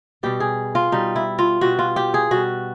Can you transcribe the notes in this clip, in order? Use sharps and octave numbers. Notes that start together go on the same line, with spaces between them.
B2 G3 G4
G#4
F4
B2 G3 D#4
E4
F4
B2 G3 F#4
F4
G4
G#4
B2 G3 F#4